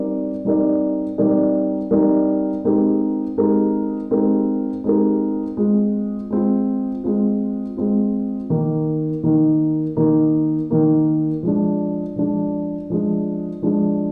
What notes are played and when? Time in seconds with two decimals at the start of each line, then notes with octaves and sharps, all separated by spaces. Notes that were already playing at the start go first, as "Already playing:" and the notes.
Already playing: G3 C4 D#4 A#4 D5
0.45 G3 C4 D#4 A#4 D5
1.18 G3 C4 D#4 A#4 D5
1.91 G3 C4 D#4 A#4 D5
2.64 G#3 C4 D#4 G4 A#4
3.38 G#3 C4 D#4 G4 A#4
4.11 G#3 C4 D#4 G4 A#4
4.84 G#3 C4 D#4 G4 A#4
5.57 G#3 C4 F4
6.30 G#3 C4 F4
7.04 G#3 C4 F4
7.77 G#3 C4 F4
8.50 D#3 A#3 D#4
9.23 D#3 A#3 D#4
9.97 D#3 A#3 D#4
10.70 D#3 A#3 D#4
11.43 F3 G#3 D4
12.16 F3 G#3 D4
12.90 F3 G#3 D4
13.62 F3 G#3 D4